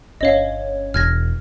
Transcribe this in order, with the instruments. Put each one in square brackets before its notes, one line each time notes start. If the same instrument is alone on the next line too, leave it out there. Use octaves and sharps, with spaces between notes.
[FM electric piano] G1 C#4 [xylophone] D#5 F5
[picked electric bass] E1 [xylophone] F6 G#6 A#6